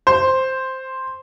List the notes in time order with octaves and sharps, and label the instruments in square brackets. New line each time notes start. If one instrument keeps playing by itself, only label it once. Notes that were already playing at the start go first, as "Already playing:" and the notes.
[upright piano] C5